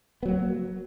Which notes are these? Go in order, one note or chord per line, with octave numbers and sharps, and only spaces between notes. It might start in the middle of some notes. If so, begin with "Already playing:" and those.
F#3 A#3 B3